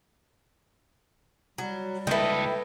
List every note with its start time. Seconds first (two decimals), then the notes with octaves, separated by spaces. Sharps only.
1.58 F#3 G3
2.07 C#2 E4 A4 B4 D#5 G5